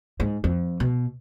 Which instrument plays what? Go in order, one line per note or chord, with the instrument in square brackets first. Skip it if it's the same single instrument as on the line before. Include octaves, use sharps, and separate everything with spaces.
[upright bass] G#2
F2
B2